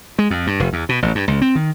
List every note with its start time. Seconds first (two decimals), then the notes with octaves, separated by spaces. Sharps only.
0.19 G#3
0.31 F2
0.47 G2
0.60 F1
0.73 E2
0.89 B2
1.02 A1
1.15 G2
1.28 C#2
1.42 C4
1.55 D#3